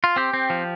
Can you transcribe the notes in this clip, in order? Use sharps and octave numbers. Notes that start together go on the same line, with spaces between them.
F4
C4 G4
C4
F3